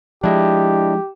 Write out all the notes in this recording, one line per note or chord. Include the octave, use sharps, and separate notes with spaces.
F3 G#3 D4 E4 G4 D#5